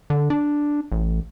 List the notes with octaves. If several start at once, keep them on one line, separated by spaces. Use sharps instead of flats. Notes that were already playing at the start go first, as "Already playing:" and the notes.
D3
D4
A1